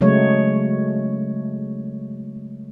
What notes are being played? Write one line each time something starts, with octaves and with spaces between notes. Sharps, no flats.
C#3 F#3 G#3 A3 C#5